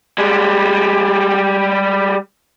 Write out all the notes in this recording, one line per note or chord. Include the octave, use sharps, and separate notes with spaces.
G3 G#3